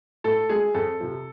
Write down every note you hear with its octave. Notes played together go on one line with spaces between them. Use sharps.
A2 A4
G#3 G#4
F2 A4
C3 F3